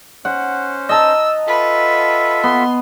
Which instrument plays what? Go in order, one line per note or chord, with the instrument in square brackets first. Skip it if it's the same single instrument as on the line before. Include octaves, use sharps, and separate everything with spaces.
[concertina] C#4 C5 [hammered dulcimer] F#5
[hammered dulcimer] D#5 A5 A#5 [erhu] E6
[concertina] F4 A4 E5 [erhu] B4
[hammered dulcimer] B3 [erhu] C6